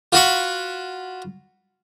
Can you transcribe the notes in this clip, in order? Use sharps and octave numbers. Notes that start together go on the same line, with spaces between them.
F4 F#4 B5 C#6